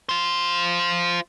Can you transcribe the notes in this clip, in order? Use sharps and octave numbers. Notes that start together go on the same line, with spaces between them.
F4 C5